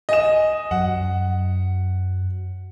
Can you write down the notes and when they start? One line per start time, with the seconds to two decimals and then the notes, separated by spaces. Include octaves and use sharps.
0.09 D#5 G#5 E7
0.71 F#2 F#3 F#5